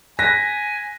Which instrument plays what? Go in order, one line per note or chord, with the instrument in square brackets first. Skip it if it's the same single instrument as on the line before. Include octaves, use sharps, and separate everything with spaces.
[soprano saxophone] G#5 [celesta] F#6 B6 [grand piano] A#6